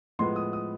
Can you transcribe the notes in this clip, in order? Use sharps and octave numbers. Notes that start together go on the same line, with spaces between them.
A2 F3 G#3 B3 C6
D#6
D#6